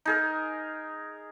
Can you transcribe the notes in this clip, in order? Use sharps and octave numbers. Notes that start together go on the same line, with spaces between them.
D#4 G#4 A#4